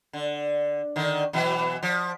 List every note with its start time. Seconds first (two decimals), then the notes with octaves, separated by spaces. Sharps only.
0.13 D3
0.96 D3 D#3
1.33 B2 E3 F#3
1.83 F3